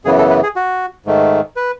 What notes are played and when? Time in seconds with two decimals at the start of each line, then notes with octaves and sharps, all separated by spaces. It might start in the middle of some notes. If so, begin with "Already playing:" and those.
0.05 F#2 C#3 E3 B3 G#4
0.18 A4
0.30 B4
0.43 G#4
0.56 F#4
1.06 G#2 D#3 A3
1.56 B4